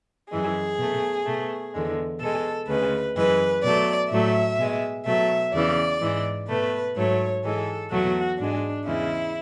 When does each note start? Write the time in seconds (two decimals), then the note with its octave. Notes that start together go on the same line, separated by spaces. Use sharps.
0.32 F#2 E3 G#3 G#4
0.79 B2 A3
1.26 B2 A3
1.74 E2 D3 G#3
2.21 B2 G#3 A4
2.69 D2 C#3 G#3 B4
3.16 F#2 E3 G#3 B4
3.64 B2 F#3 A3 D5
4.11 A2 F#3 A3 E5
4.59 B2 G#3
5.06 B2 F#3 A3 E5
5.54 E2 C#3 E3 D5
6.02 G#2 E3 G#3
6.49 B2 A3 B4
6.96 G#2 F#3 A3 C#5
7.44 G#2 E3 G#3 A4
7.92 E2 B2 F#3 A3 F#4
8.39 G#2 G#3 D4
8.87 E2 C#3 G#3 E4